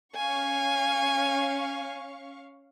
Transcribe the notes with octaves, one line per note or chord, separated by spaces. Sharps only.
C#4 F5 G#5 C#6